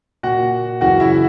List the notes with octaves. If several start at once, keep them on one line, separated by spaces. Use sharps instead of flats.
A#2 F#4 F#5
F#2 C#3 E3 F#4 F#5
E4 E5